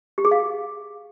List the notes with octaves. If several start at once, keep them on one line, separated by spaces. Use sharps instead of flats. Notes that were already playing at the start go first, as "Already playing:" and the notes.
G4
G#4
F5